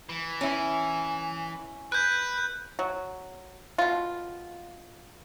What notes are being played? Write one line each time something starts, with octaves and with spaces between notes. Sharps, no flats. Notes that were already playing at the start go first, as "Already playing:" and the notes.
E3
C#4 E4
B4 F#6 G6
F#3
B2 F4